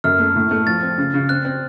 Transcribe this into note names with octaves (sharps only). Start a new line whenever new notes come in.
F#2 F6
A3
A2
A3
F3 A6
C4
C#3
C#3
C4 F#6
C4